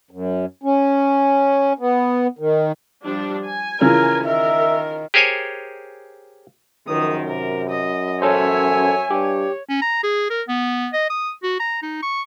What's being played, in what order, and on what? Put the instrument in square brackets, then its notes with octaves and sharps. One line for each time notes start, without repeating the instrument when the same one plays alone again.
[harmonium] F#2
C#4
B3
D#3
[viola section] F3 G3 D4
G#5
[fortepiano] C#3 E3 F3 [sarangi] A#4
[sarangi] D#3 [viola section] A#4 [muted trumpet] E5
[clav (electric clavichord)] G4 G#4 A#4 C5 C#5 G#5
[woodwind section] C#2 D#6 [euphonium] F#2 [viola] D#3 F3
[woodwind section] C3 [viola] A#4
[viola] D#5
[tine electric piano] C#4 A4 C5 [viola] C#5 E5 [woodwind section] G#5
[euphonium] G2 [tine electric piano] G4 [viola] C#5
[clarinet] C#4
A#5
G#4
A#4
B3
D#5
D#6
F#4
A#5
D#4
C#6